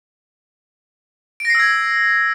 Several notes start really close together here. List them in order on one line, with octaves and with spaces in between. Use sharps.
D7 A#6 C7 E6 G#6